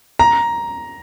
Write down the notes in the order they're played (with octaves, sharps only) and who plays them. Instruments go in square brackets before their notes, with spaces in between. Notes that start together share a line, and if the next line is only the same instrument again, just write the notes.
[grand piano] A#5